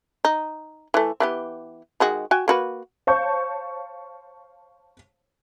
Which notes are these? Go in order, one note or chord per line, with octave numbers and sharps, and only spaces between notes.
D#4
E3 A3
E3 B3 G4
D#3 G#3 F#4
F#4 G5 G#5
A#3 F#4 B4
C5 C#5 F5 A5 C#6 G6